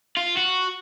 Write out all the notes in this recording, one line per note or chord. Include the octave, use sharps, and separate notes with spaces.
F4
F#4